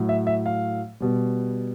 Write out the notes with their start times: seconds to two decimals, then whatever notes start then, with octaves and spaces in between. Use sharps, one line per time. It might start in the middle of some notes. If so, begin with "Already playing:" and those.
Already playing: A2 F#3
0.09 E5
0.27 E5
0.46 F5
1.00 B2 G3